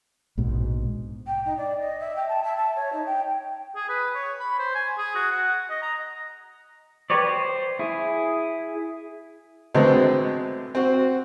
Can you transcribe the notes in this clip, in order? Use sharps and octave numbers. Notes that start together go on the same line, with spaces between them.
A#1 G#2 B2
G5
D#4
D5
D#5
E5
G5
A5
E5
A5
C#5
D#4
G5
G#4
B4
C#5
B5
C5
G#5
G#4
F#4
F#5
D#5
A#5
G4 B4 C#5 D5
C5
E4 G#4
D3 F#3 G#3 A3 B3 C4
C4 F#4